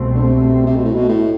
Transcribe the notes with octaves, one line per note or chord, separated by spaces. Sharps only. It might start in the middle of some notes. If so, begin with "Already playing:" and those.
Already playing: C2 B2 A3 C4
D3
C3
C3
B2
A2
B2
A2